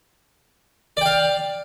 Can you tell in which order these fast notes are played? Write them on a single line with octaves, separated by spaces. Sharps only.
D5 G5 F5